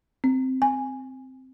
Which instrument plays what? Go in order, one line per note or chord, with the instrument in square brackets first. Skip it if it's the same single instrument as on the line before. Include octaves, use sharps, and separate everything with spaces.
[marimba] C4
G#5